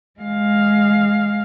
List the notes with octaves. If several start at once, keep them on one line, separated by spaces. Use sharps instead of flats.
G#3 F5